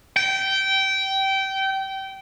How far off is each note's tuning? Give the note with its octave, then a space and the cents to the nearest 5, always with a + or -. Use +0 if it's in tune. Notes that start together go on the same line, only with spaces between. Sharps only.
G5 -20